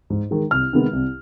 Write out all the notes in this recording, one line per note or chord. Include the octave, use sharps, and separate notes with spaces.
G#2
D#3 G#3
C2 F6
C3 D#3 G#3 B3
C2